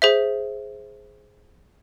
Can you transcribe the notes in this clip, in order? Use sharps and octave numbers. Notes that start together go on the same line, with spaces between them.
G#4 C5 E5